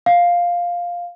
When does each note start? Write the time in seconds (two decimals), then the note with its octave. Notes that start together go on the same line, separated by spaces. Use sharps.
0.06 F5